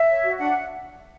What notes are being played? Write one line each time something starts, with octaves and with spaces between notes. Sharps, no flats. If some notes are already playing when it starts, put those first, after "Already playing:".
Already playing: E5
C#5
F#4
D4 F#5